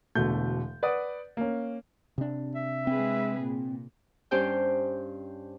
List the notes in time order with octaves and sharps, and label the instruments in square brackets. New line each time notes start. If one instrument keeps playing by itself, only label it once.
[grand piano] E1 B2 D3 A3 G6
B4 D5 F#5 D#6
A#3 C#4
[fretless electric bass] C3 D4
[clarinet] E5
[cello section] G#3 G#4 B4 [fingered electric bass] C4
[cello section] A#2
[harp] G2 C#4 G4 C5 G5 G6